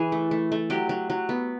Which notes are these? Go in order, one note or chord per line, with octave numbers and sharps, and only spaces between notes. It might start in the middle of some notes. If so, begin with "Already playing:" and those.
Already playing: E3 G#4
A3
A3
A3
F#3 G4
F#3
F#3
B3